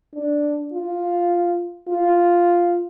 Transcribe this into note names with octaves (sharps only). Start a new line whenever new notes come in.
D4
F4
F4